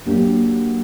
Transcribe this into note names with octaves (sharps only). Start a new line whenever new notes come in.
F#3 A#3 D4 G4